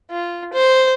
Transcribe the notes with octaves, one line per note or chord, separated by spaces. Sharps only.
F4
C5